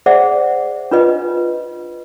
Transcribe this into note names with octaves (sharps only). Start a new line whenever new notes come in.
G#4 C5 D5 E5 F#5
D4 F4 B4 D#5